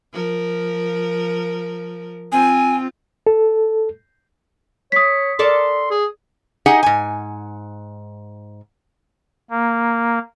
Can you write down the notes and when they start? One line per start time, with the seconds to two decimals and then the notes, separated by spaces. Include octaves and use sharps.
0.13 F3 A#4
2.32 C4 F4 G#5
3.27 A4
4.92 C#5 D#6 B6
5.39 A4 A#4 D5 C6
5.91 G#4
6.66 D#4 G4 G#4 D#5 F#5 G#5
6.83 G#2 G#5
9.51 A#3